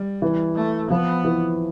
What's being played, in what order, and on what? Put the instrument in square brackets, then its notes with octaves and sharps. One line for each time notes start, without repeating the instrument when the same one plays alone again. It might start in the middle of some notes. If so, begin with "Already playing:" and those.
Already playing: [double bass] G3
[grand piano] E3
[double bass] A3
[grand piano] F3 [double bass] B3
[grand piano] E3